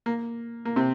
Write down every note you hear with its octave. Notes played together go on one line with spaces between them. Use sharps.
A#3
A#3
C3 C4